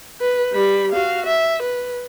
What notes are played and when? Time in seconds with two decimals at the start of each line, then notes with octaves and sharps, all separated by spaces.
0.21 B4
0.53 G3 B5
0.92 F#4 F5
1.26 E5
1.62 B4